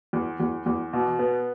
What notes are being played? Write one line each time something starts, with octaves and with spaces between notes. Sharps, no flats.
E2
E2
E2
B2
B3